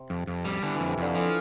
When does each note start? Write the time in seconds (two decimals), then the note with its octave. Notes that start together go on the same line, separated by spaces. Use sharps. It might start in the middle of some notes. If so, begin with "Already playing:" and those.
Already playing: C3
0.10 F2
0.27 F2
0.45 G3
0.62 D3 E3
0.76 F2 E3
0.89 C3
0.98 F2 D3
1.15 E3 F3